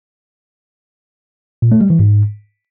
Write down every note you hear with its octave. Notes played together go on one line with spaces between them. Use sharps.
A#2
A3
G3
E3
G#2